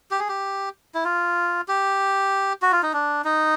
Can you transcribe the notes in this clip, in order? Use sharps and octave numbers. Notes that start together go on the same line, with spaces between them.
G4
G#4
G4
E4
F4
G4
F#4
F4
D#4
D4
D#4